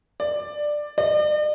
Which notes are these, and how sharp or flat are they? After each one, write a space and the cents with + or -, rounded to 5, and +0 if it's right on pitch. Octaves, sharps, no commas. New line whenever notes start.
D5 +10
D5 +45